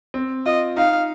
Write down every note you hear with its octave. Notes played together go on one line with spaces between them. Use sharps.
C4
F4 D#5
D#4 F5